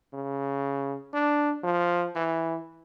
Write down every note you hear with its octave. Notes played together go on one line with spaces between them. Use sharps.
C#3
D4
F3
E3